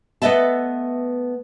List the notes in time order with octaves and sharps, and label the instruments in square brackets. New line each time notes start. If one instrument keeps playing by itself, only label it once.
[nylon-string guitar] A3 B3 B4 D#5 E5 A5